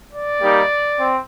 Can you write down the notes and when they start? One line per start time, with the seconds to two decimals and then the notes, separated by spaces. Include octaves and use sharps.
0.13 D5
0.41 G3 A#3 D#4 G4
0.97 C4